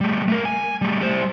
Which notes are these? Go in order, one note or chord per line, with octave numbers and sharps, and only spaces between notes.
G3 A3
A3 A#4
G#5
G3 A3
G3 C5